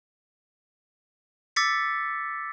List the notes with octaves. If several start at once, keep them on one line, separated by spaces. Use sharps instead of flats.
D6 E6 A6 B6 C#7